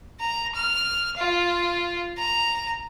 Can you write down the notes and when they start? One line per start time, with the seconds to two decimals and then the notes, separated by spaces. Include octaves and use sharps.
0.20 A#5
0.55 F6
1.17 F4
2.18 A#5